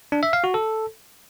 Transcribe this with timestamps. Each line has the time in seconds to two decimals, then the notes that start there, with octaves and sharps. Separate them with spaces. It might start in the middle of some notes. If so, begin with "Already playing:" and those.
0.12 D4
0.23 E5
0.33 F5
0.44 F#4
0.54 A4